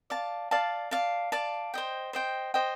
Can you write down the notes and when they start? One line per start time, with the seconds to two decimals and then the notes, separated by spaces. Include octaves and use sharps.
0.10 D5 F5 A5
0.51 D5 F5 A5
0.91 D5 F5 A5
1.32 D5 F5 A5
1.74 C5 D#5 G5
2.13 C5 D#5 G5
2.54 C5 D#5 G5